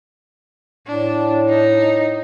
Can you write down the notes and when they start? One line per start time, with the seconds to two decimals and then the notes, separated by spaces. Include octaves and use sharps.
0.87 A2 D4
1.49 D#4